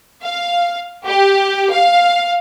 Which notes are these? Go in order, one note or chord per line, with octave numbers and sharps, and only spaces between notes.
F5
G4
F5